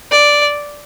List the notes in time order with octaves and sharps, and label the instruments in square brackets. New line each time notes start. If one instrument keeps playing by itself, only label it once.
[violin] D5